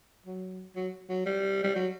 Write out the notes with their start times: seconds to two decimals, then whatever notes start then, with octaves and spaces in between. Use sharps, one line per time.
0.26 F#3
0.76 F#3
1.09 F#3
1.25 G3
1.63 G3
1.75 F#3